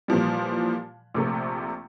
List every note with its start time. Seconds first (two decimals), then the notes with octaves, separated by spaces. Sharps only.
0.08 A#2 E3 F3 G3
1.14 A#1 C3 A3